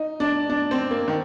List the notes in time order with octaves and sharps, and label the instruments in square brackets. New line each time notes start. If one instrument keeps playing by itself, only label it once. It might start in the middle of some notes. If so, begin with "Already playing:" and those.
Already playing: [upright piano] D#4
D4
D4
C4
A#3
D#3